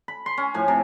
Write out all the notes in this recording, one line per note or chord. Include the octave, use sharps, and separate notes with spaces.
B5
C6
C#4
A2 F3 G#5
C3